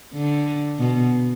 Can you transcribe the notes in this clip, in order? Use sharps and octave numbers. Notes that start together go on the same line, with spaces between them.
D3
B2